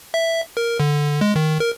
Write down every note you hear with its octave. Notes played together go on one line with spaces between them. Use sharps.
E5
A#4
D3
G#3
D#3
A#4